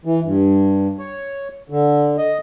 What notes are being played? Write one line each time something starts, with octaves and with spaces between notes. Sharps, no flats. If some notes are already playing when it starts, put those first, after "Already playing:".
E3
G2
C#5
D3
D#5